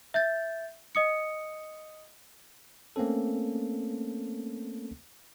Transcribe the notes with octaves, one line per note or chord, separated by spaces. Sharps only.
E5 G6 A6
D#5 D#6 C#7
A3 A#3 C4 C#4 A4